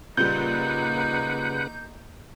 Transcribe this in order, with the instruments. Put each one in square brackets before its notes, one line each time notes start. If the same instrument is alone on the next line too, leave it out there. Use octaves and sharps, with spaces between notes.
[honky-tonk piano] A#2 G3 [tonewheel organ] C#3 B4 F#5 [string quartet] A#3 D#4 [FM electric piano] G6